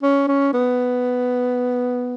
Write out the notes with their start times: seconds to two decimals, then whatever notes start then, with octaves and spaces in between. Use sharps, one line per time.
0.03 C#4
0.28 C#4
0.54 B3